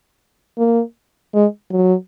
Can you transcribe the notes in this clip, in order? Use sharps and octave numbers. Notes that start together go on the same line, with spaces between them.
A#3
G#3
F#3